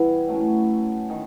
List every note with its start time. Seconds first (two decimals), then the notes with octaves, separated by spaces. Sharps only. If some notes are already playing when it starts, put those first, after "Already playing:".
Already playing: E3 G3 B3 E4
0.28 A2 F#3 A3 C#4
1.10 D#3